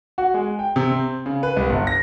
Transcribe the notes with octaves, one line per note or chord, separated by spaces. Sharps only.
F#4
G#3
G5
C3
C4
C#3
B4
C2
G1
A#6